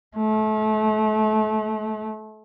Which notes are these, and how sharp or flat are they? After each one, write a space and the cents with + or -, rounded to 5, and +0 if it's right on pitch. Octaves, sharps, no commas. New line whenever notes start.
A3 -30